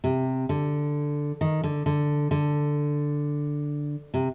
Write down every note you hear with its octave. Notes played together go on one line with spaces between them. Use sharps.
C3
D3
D#3
D3
D3
D3
C3